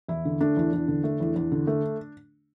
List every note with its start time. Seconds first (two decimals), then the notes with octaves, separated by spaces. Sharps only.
0.08 E2 E4
0.25 D3
0.41 A3 D4
0.57 E2
0.73 E2
0.88 D3
1.04 A3
1.20 E2
1.36 E2
1.52 D3
1.67 A3